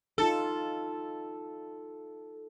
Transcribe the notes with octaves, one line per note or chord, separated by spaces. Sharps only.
D#4 F4 A4